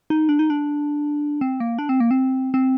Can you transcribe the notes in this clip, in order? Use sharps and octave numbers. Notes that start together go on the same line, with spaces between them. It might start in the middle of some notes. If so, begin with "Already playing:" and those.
D#4
D4
D#4
D4
C4
A#3
D4
C4
A#3
C4
C4